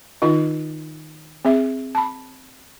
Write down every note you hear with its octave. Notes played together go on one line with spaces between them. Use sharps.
D#3 D#4 F4 D#5
C4 G#4 E5
A5 B5